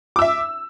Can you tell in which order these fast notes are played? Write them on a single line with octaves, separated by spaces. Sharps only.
D6 E6 E5